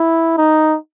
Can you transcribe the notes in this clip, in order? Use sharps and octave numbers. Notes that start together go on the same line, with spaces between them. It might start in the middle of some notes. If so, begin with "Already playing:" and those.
Already playing: E4
D#4